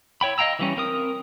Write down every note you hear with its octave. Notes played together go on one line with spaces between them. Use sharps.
E4 C#5 G5 B5
D#5 F5 G5 A#5 E6
E3 G3 C#4
C4 A#4 D#6